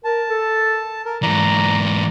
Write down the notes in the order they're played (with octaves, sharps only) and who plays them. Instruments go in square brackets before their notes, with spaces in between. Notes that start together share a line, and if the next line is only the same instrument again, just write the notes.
[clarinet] A#4 [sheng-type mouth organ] A5
[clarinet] A4
[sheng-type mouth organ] A#4
[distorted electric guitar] G#2 E3 [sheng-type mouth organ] D5 [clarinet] A#5